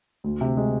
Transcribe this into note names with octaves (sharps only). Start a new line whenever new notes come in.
D2
C3
G#3